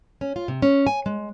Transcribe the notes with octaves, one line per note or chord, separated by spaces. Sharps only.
C#4
F4
C3
C#4
G#5
G#3